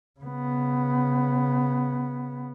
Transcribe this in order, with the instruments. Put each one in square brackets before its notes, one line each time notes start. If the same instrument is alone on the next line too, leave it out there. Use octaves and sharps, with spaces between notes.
[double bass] C#3 B3